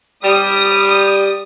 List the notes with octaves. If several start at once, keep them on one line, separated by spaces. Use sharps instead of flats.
G3 D#6